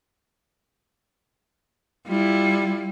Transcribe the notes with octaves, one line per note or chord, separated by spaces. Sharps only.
G3 E4 F4